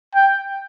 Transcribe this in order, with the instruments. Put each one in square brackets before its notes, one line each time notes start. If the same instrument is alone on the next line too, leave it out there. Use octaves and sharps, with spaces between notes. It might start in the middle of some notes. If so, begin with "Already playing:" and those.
[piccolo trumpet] G5